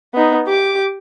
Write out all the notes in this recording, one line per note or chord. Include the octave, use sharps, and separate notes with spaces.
B3 D#4
G4 D6